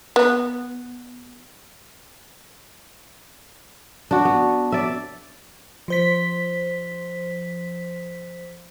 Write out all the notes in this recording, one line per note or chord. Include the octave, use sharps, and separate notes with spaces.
B3
D4 F#4
B3
D5 E5
F3 C5 B6